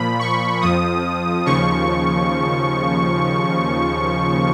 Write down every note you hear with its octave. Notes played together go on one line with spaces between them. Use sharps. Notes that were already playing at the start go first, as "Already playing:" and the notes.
Already playing: A#2 F3 B5
C#6
F2 F3 D#6
D#2 C#3 F3 C#6